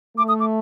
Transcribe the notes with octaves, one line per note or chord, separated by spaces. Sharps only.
A3 D6
D#6
D6